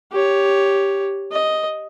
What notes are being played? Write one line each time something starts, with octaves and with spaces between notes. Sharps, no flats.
G4 C#5
D#5